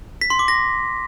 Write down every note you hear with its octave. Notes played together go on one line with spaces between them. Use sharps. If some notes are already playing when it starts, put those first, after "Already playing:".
B6
C6
D6
A#6